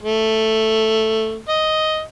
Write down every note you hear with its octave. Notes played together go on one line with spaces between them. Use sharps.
A3
D#5